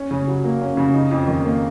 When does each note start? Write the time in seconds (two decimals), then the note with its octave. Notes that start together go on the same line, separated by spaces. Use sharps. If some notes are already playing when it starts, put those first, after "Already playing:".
Already playing: C#4
0.11 C#3
0.28 F#3
0.44 A#3
0.61 C#4
0.77 C#3
0.94 D#4
1.11 F2
1.28 D#3
1.45 A#3